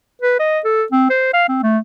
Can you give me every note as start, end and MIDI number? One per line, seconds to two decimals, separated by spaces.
0.22 0.35 71
0.40 0.59 75
0.65 0.84 69
0.92 1.07 60
1.10 1.31 72
1.34 1.45 77
1.49 1.62 60
1.63 1.78 57